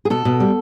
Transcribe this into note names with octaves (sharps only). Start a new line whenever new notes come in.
G#4
B2 A4
B2
G3